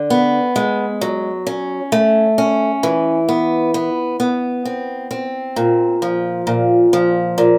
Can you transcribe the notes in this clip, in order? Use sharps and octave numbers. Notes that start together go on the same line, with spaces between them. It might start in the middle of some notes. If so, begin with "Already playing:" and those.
Already playing: D3
B3
G#3
F#3
C#4
A3
C#4
E3
B3
B3
B3
C4
C4
A#2
F3
A#2
F3
A#2